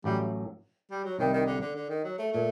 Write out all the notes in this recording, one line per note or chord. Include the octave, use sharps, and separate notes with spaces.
A1 A2 F#3 G3
G3
F#3
C2 C3 D#3 G3
D#3
D3
D3
D3
D#3
F#3
A3
A#2 A3